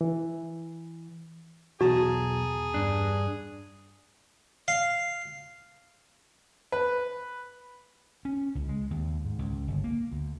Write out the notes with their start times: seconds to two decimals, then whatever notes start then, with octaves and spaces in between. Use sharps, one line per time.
0.01 E3
1.81 B1 E2 F#4 G#4 A5 A#5
2.74 G2 D4
4.68 F5
6.72 B4
8.25 C#4
8.55 C#2
8.69 G#3
8.91 D#2
9.25 G#2
9.39 C#2
9.68 G1
9.84 A#3
10.11 D2